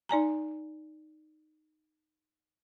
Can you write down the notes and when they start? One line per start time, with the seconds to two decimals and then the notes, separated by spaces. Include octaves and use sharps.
0.09 D#4 D5 G#5 A#5